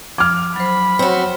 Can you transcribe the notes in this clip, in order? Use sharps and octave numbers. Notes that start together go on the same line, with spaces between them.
F3 D6 F6
F#3 C5 B5
C4 F#4 C#5